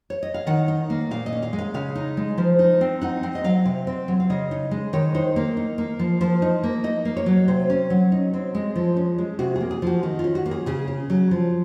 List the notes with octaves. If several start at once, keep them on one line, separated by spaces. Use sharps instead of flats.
C#5
D#5
F5
D#3 F#5
D#4
A#3
A#2 F5
D#5
C#4
F5
G#3
F5
C#3 F5
D#4
G#3
F3 C5
D#4
C4
D#4 F#5
C4 F#5
D#5
F#3 F5
C3
C4
F#3
F5
C#3 D#5
D#4
G#3
D#3 C#5
D#4 C5
A#3 A#4
D#4
A#3
F3
F3 C5
D#4
A#3
D#4 D#5
A#3
C#5
F#3
C3 C5
C#4
F#3
D#4
C4
G#3
F3
C#4
G#3
C3 F#4
A#3 G#4
G#4
F3 F#4
D#3 F#4
F4
C#4
F#4
A#3
G#4
C#3 G#4
C#4
F#3
F3